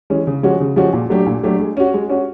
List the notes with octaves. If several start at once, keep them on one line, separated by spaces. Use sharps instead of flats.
E3 G#3 C#4
C#3
F3 G#3 C#4 F#4
C#3
F3 G#3 C#4 F#4
A#2
F#3 A3 D4 G4
A#2
F#3 A3 D4 G4
G#3
C#4 F#4
G#3
C#4 F#4